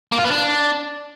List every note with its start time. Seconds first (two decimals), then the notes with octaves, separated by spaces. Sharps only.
0.12 A#3
0.18 F4
0.25 B3
0.31 D4